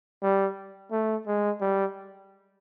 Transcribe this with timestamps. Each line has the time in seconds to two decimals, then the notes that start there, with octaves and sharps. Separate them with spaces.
0.23 G3
0.92 A3
1.26 G#3
1.61 G3